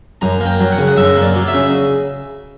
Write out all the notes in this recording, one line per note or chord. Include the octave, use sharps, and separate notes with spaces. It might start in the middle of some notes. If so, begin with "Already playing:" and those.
F#2 A#5
A#3
G5
F#3
F#5
C#3
F#5
F#2 E5
A#3
D5
F#3
E5
C#3